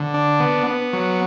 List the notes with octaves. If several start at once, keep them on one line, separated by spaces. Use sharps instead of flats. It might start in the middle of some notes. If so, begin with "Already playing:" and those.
Already playing: D3
D4
B3
B3
F#3